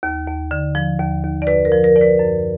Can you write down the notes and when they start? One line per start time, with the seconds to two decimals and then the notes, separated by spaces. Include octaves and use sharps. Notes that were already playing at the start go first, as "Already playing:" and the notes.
0.03 D#2
0.28 D#2
0.51 D3
0.75 F3
0.99 D#2
1.24 D#2
1.42 D5
1.47 F#2 B4
1.65 A#4
1.72 F3
1.84 A#4
1.96 F3 D5
2.01 B4
2.20 F#2